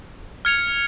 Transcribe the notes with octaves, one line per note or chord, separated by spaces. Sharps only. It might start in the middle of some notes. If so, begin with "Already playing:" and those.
F6 G#6 C#7 F7